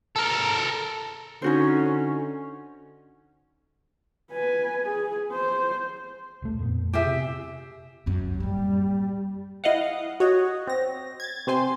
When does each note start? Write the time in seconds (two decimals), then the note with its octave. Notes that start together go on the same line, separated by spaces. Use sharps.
0.16 A4 A#4
1.42 D3 C#4 D#4 F#4 C5
4.31 B4 G#5
4.85 G#4
5.32 C5
6.42 D#1 B1 A3
6.59 F2 A#2 B3
6.93 G4 G#4 E5
7.06 C3
8.06 C2 F#2
8.40 A2 G3 A#3
9.64 E4 D#5 F5 F#5
10.20 F#4 C#5 D#5
10.67 C4 A#6
11.20 G#6 A6
11.47 C3 C4 C5 G#5 C6